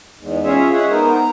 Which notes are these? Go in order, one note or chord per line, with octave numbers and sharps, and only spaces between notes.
E2 G#2
C#4 F4 G#4 C#5 E5
G#3 G#4 C#5 E5 F#5
B3 D#4 A#4 C5
A#5